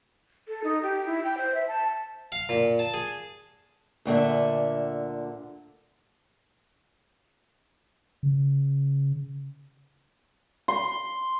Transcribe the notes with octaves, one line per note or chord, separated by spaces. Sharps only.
A4
D#4
G4
E4
G5
C5
E5
A5
F5
A#2
A5
G#4
D2 A#2 D3 E5
C#3
C6